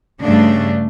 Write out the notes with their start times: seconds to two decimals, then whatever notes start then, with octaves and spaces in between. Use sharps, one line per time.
0.22 G2 C#3 A3 D4